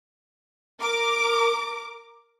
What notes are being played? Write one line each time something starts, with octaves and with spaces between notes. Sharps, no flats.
A#4 D6